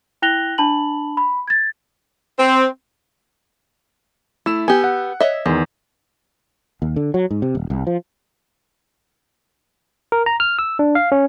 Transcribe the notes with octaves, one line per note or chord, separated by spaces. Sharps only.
E4 G5 F#6 A#6 F7 G7
D4 A5 B5 F#7
B5
G#6 A6
C4
A3 E4 E6 E7
B3 G4 G#5
F#5
C#5 D#5 E5
E2 D#3 G#3
D#2
D3
F#3
G#2
C3
D#1
C2
F3
A#4
A#5
F6
E6
D4
F5
C#4